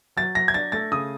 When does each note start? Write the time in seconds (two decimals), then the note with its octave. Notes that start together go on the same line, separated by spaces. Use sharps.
0.17 F#3 A6
0.35 F#3 A#6
0.48 G#6
0.54 D4 A6
0.72 A3 A6
0.92 C#3 D#6